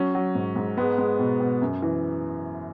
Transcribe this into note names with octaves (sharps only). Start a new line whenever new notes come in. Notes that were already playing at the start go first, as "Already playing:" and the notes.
Already playing: F#3 C#4
F#3
G#2
G#2
G#3 B3
G#3
B2
B2
F#2
E3